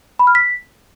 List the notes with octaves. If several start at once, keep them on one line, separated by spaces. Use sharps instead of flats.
B5
F6
B6